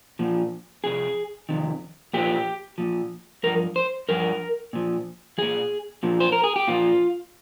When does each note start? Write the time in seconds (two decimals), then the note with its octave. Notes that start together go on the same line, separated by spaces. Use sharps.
0.19 A#2 F3
0.84 F2 C3 G#4
1.49 F2 C3 D#3
2.13 A#2 F3 G4
2.78 A#2 F3
3.43 G2 F3 A#4
3.76 C5
4.09 G2 F3 A#4
4.73 A#2 F3
5.38 A#2 F3 G#4
6.03 A#2 F3
6.20 C5
6.32 A#4
6.44 G#4
6.56 G4
6.67 A#2 F3 F4